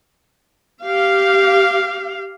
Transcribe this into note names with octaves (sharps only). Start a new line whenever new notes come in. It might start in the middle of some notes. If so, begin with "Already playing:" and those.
G4 F5